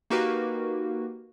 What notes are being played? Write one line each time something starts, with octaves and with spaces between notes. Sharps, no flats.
A#3 D#4 F#4 G4 A#4 B4